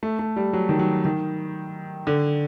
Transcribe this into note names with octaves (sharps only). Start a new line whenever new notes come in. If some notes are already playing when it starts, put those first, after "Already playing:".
A3
A3
G3
F#3
D#3
F#3
D#3
D3